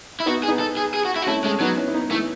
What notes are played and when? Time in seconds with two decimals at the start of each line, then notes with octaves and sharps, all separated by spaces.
0.20 E4
0.26 B3 D#4 F#4
0.43 G#4
0.48 B3 D#4
0.59 A4
0.77 G#4
0.94 G#4
1.05 F#4
1.16 E4
1.22 F#4
1.27 A3 C#4 E4
1.44 G#3 A3 C#4
1.60 F#3 B3 D#4
1.77 C#4 E4
1.88 E4
1.93 B3 D#4
2.11 E3 A3